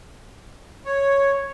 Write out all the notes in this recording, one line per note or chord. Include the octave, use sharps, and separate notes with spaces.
C#5